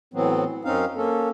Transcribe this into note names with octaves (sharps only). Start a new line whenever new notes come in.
A2 E3 F#3 B3 C4
F#2 C4 C#4 D#4 F5
A#3 C#4 A4